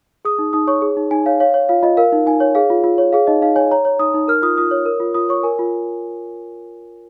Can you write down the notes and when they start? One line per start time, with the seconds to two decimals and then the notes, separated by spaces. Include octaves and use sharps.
0.25 G#4 D#6
0.39 D#4
0.53 D#4 D#6
0.67 C#5 C#6
0.82 G#4
0.97 D#4
1.11 D#4 G#5
1.26 C#5 F5
1.40 C#5 F5
1.54 C#5
1.69 F4 F5
1.83 F4 D#5
1.97 A#4 F5
2.12 D#4
2.26 D#4 G#5
2.40 C#5
2.55 G#4 F5
2.70 F4
2.84 F4
2.98 C#5
3.13 G#4 F5
3.27 D#4 D#5
3.42 D#4 F5
3.56 C#5 G#5
3.71 C#5 A#5
3.85 C#5
3.99 D#4 D#6
4.14 D#4
4.28 A#4 F6
4.42 F4 D#6
4.58 F4 D#6
4.71 C#5
4.86 A#4
5.00 F4
5.14 F4 D#6
5.29 C#5 C#6
5.43 A#4 G#5
5.59 F4